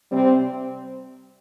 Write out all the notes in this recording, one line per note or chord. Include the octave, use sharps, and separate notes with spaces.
C3 G3 C4